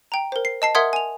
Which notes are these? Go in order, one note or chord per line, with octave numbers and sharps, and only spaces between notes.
G5 A#5
A#4 C5
C7
D#5 A5 C7
A#4 E5 F#5 C6 D#6 G#6
G#5 F7